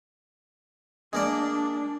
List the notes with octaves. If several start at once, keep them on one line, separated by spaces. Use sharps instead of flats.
G#3 A#3 D4 D5